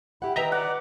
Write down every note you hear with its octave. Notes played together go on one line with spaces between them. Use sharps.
E4 G4 F#5
D#3 B4 D#5 E5 G5 A#5
D5 F#5